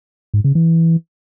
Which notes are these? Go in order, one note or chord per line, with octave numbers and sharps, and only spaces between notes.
G#2
C#3
E3